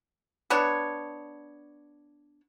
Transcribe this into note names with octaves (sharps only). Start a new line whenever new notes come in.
B3 D4 C#5